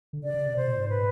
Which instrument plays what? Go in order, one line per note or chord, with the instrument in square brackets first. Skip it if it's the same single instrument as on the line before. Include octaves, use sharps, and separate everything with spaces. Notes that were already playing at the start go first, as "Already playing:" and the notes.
[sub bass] D3
[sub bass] C#3 [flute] D5
[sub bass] C#3
C3
[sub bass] C3 [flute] C5
[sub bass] A#2
G#2
[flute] B4